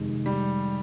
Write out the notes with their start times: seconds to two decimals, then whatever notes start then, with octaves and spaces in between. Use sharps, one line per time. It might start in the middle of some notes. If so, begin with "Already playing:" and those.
Already playing: F2 C3 D#3 G#3
0.26 G3